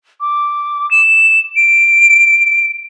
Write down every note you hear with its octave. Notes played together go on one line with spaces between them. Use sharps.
D6
E7
D7